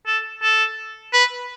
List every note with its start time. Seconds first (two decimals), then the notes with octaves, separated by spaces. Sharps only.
0.07 A4
0.43 A4
1.13 B4